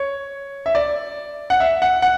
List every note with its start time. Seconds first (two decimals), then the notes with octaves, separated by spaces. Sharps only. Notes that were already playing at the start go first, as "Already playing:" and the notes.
Already playing: C#5
0.66 E5
0.75 D5
1.50 F#5
1.60 E5
1.82 F#5
2.02 F#5